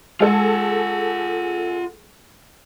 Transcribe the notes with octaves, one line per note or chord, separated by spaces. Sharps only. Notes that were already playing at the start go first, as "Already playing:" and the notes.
G#3 F4 G#4 A4 F#5